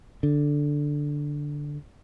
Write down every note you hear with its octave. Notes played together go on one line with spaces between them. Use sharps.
D3